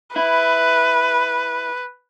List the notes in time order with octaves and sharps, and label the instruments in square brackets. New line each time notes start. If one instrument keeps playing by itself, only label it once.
[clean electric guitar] E4 [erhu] B4